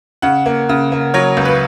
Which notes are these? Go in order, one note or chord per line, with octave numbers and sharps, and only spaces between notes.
C#3 F#5
A#3
C#3
A#3
F#3 C#5
C#2
B4